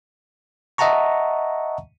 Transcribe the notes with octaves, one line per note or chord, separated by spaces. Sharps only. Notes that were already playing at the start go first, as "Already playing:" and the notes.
D#5 E5 F#5 A5 A#5 C#6